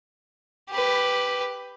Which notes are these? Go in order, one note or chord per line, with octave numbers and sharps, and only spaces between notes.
G4 B4